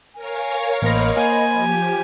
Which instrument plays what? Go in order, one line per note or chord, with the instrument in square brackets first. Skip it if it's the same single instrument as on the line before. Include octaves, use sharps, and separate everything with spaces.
[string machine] A#4 C#5 F5 [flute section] G#5
[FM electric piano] A1 A#3 A#6 [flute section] C5 D#5 B5
[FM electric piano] A#3 [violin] G#5
[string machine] F3 G4